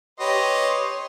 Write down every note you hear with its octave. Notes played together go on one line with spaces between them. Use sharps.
G4 B4 C#5 D#5 C6